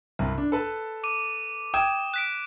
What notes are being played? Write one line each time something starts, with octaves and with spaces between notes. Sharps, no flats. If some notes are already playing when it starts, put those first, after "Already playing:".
C2 G2
D4
A4 B4 A5
D6 D#7
G5 D#6 G#6 E7
F#6 B6 D7